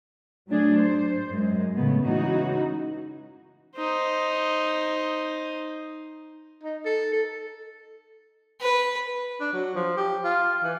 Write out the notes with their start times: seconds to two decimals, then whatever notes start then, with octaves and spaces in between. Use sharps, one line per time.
0.48 F#3 A3 D4 G#4
0.77 C5
1.31 F#2 G#3
1.75 A2 C#3 A3 B3
2.05 C#3 E3 G#3 D#4 F#4
3.77 D#4 C5
6.63 D#4
6.85 A4
7.13 A4
8.61 B4
9.40 D4
9.53 F#3
9.75 F3
9.97 G4
10.24 F4
10.64 E3